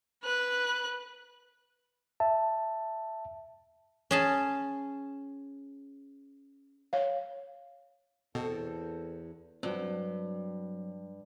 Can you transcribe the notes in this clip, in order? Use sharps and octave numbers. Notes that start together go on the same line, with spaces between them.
B4 F#6
E5 A5
C#4 G#4 A5
C#5 F5
E2 B2 C4 A4
G2 F#3 C4